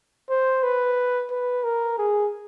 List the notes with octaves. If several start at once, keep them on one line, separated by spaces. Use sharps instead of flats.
C5
B4
B4
A#4
G#4